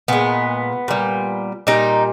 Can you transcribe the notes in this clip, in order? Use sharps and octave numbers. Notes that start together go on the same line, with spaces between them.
A#2 G#3 B3
A#2 G3
A#2 G3 D#4